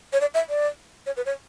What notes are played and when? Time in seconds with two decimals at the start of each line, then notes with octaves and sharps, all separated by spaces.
0.13 C#5
0.21 D5
0.34 E5
0.49 D5
1.06 C#5
1.17 B4
1.26 C#5